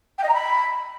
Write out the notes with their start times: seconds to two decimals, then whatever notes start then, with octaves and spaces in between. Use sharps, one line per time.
0.18 G5
0.23 D#5
0.29 A#5
0.34 B5